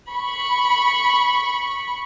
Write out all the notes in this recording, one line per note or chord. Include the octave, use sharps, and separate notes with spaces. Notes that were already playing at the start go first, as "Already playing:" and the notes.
B5 C#6